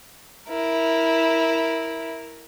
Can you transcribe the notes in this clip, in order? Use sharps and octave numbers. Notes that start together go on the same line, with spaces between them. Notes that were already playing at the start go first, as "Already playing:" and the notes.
E4 A#4